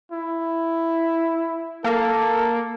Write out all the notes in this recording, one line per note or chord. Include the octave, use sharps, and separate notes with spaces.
E4
A#3 A4